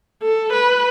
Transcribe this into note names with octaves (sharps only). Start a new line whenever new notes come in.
A4
B4